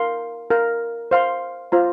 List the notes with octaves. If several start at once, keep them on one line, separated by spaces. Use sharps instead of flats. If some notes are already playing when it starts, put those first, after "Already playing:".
Already playing: A#4 F5 C6
A#4 F5 A#5
C5 F5 C6
F4 C5 A#5